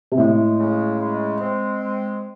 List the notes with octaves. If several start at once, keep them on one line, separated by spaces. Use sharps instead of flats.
C3
A2 G#3
C#3
G#3
C4
G#3